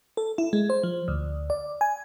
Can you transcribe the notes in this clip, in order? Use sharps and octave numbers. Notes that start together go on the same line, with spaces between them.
A4
E4
G#3
C5
F3
D2
D5
G#5